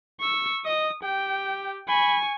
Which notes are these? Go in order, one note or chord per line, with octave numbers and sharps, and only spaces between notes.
C#6 E6
D#5 D#6
G4 G5
G#5 B5 C#6